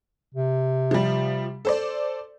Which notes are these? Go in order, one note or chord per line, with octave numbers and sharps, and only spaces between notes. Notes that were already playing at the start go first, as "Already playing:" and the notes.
C3
F3 G3
A4 C5 D5